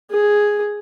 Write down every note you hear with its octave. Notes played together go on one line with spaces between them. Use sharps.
G#4